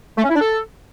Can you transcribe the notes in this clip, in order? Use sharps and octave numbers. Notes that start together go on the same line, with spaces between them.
A3
C#4
E4
D4
A4